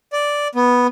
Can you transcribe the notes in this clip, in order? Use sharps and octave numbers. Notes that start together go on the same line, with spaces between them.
D5
B3